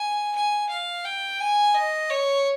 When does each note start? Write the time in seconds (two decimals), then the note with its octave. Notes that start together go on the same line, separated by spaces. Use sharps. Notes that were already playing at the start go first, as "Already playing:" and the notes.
Already playing: G#5
0.35 G#5
0.69 F5
1.05 G5
1.40 G#5
1.75 D#5
2.10 C#5